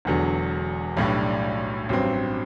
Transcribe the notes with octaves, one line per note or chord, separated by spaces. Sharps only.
E1 E2 D3 F#3
B1 A2 G3 D4
A1 G2 F#3 C4